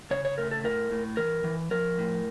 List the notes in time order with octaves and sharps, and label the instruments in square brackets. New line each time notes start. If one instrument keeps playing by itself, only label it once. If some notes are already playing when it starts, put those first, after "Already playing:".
[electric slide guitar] C#3 C#5
C#5
A3 A#4
A4
A2 A#4
A2
E3 A#4
E3
F3 A#4
A2